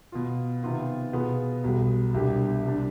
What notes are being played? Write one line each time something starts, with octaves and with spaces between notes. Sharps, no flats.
B2 B3 F4
C3 D#3 B3 F4
B2 B3 F4 G#4
B1 B2 G3
C2 B2 G3 D4 G4
C3 G3 D4